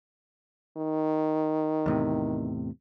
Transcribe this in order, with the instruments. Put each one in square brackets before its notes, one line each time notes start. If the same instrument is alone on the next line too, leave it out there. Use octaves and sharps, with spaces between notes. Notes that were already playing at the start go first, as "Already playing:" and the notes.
[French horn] D#3
[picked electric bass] E2 A2 C3